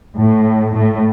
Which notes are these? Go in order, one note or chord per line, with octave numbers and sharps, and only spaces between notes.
A2
A2